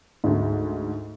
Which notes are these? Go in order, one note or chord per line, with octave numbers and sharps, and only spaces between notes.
D2 G#2